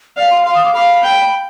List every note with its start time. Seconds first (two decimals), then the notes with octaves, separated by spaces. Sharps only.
0.17 D5 F5
0.31 C6
0.45 F5 C6
0.55 D#6
0.65 D6
0.74 F5 B5
1.03 G5